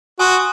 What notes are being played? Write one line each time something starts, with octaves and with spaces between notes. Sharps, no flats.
F#4 G#5 C6 D#6